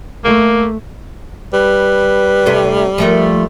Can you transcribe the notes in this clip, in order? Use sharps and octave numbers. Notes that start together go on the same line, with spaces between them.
A3 A#3
G3 B4
C3 A3 D4
F3 A3 A#3